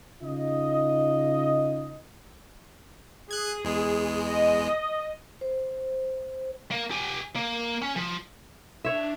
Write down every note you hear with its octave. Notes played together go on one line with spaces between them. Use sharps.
C#3 D#4 F4 D#5
G#4 F#6 G#6
E2 G#3
D#5
C5
A#3
G4 G#5
A#3
C#4
F3
D4 C#5 E5